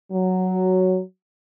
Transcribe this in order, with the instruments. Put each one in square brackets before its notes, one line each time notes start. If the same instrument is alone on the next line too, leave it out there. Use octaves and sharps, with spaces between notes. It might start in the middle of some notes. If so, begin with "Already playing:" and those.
[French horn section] F#3